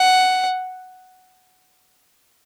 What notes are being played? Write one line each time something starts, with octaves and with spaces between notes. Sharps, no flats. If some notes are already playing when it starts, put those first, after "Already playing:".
Already playing: F#5